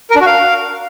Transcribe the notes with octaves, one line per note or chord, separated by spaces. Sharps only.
A#4
D4
F#4
F5